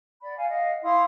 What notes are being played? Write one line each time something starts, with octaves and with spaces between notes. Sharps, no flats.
D5 F#5 B5
F5 F#5 G#5
D#5 F5 F#5
E4 F5 C6 D#6